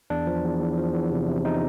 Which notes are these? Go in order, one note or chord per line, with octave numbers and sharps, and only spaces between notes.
E2 D4
F3
E2
E2
F3
E2
C3
C3
C3 D#4